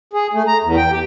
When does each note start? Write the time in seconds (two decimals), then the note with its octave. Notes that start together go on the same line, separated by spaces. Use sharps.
0.13 G#4
0.33 A3
0.48 A#5
0.64 E2
0.77 G5
0.92 G4